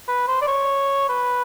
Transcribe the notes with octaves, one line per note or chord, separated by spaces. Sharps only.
B4
C5
D5
C#5
B4